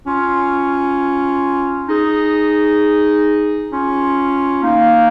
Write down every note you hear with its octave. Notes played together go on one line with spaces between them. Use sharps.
C#4 F4
D#4 G#4
C#4 F4
A#3 D#4